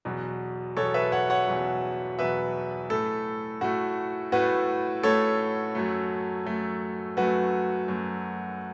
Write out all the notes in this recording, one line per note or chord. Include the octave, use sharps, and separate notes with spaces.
E2 B2 F#3
E2 B2 F#3 A4 C#5
B4 E5
C#5 F#5
C#5 F#5
E2 B2 F#3
E2 B2 F#3 B4 E5
A2 A3 A4
A2 A3 F#4
A2 A3 F#4 B4
A2 A3 A4 C#5
F#2 F#3 A3
F#2 F#3 A3
F#2 F#3 A3 F#4 B4
F#2 F#3 A3